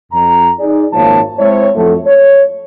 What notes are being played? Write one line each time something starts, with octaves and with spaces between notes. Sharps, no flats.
F2 A#5
D#4 G#4 D5
G#1 F#2 F3 A#3 C#5 A5
G#3 C4 E4 C5 C#5
F2 A2 F#3 A3
C#5